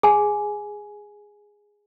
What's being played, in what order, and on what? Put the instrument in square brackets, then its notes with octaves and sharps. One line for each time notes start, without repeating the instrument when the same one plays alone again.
[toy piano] G#4 G#5